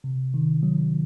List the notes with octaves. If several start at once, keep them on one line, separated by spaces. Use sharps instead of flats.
C3
D#3
F#3